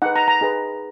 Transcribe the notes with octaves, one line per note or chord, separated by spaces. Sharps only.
D#4 G#4 B4 F#5
A#5
A#5
D#4 G#4 B4